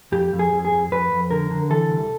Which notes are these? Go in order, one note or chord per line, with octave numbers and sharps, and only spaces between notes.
F2 G4
F2
G#4
F2
G#4
F2
F2 B4
F2
D3 A#4
D3
E3 A4
C2